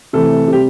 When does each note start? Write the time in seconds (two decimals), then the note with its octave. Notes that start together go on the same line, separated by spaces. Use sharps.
0.13 C3 E3 A3 A4
0.48 C3 G3 G4